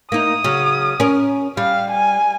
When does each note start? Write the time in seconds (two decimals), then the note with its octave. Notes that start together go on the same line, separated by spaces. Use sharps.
0.12 A#3 D#4 D#6
0.44 C#3 F#3
1.00 C#4 A#4
1.57 G3 F5
1.91 G#5